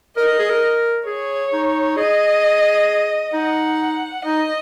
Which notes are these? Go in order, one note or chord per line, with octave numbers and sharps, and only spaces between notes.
A#4 D#5
A#4
G#4
A#4
G#4 C#5
D#4
G#4 D#5
D#4 F#5
D#4 D#5